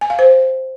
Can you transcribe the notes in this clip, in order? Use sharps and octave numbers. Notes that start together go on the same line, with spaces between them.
G#5
F5
C5